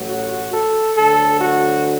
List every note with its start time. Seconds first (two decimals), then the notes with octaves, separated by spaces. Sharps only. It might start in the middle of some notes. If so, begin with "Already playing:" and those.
Already playing: A1 A2 F#3
0.08 F#4
0.53 A4
0.96 D2 D3 F#3 A4
1.41 F#4